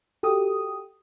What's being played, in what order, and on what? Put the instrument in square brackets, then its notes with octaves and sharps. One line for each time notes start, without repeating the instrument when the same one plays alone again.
[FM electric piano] F#4 G4 A4 D#6